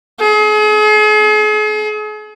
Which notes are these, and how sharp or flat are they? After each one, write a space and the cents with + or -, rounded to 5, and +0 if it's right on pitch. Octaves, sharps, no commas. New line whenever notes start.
G#4 +40